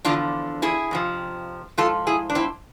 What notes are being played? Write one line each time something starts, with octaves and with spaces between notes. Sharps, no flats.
E2 D3 F3 D4 F4
E4 G#4
F2 C3 F3
G#2 F3 F4 A4
E4 G#4
D4
C4 E4